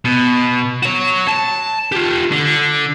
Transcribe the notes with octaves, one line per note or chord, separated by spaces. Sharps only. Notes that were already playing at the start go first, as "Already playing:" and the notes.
B2
F#4 C#5
A5
F4 G4
D3